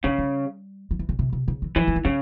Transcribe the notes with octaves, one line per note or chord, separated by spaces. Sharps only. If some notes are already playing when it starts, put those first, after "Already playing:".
C#3 G#3
G3
F3
E3
C#3
C3
C3
C#3
E3
E3 F3
G3
G#3
C#3 G3